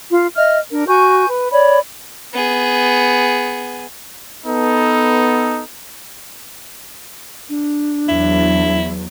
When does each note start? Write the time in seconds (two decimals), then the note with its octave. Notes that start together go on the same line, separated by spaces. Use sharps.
0.11 F4
0.37 D#5 E5 F6
0.71 D4 A#4
0.88 F#4 G#5 C#6 G6
1.28 B4
1.51 C#5 D5 B5
2.33 B3 G#4
4.46 B3 D#4 A4
7.49 D4
8.09 E2 F#3 E4